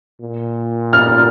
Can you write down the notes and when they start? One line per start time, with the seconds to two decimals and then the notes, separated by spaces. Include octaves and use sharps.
0.21 A#2
0.93 F6